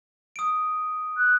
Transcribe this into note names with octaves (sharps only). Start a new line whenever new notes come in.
D#6 D7
F#6